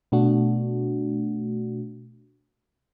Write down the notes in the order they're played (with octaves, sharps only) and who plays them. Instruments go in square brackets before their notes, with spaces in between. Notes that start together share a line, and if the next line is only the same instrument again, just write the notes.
[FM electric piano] B2 A3 D4 F#4